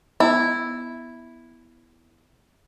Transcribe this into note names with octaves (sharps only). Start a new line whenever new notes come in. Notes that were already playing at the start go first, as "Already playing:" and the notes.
B3 E4